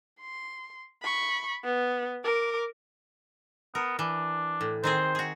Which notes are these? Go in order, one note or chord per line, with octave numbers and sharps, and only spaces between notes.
C6
B5 C#6
B3
A#4 D6
B3 A#4
E3 D4
A2
D#3 C4 G#4 C5
F#4 G#4